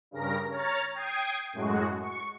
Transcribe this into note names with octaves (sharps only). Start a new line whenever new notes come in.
G2 C#3 A#4 A#6
C#5 A#5 F6 A6
G5 D#6 G#6 C7
F#2 A2 G#3 F#4
C#6